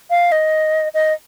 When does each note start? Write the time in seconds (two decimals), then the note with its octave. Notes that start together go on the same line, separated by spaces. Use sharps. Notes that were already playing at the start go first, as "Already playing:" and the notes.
0.10 F5
0.32 D#5
0.94 D#5